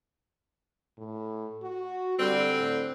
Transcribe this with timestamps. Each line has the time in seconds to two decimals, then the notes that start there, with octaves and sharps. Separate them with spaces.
0.98 A2
1.62 F#4
2.19 D3 G3 C4
2.58 A2